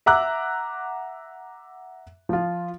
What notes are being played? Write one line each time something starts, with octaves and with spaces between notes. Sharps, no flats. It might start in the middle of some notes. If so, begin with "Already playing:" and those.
E5 F#5 A#5 D6 E6 F#6
F3 F4